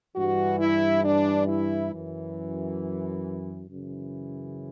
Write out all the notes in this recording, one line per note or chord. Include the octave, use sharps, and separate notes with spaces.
G2 E3 F#4
E4
D4
E4
F#2 E3
F#2 C#3 E3